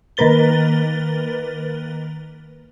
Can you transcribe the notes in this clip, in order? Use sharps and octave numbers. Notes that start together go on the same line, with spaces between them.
D#3 A#3 A#4 B4 A6 G7